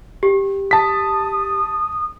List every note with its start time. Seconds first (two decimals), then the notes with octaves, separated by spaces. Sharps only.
0.23 G4
0.71 A5 D#6 B6